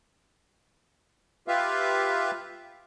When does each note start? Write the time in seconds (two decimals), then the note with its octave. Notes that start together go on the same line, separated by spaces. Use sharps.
1.48 F4 G4 B4 E5 F5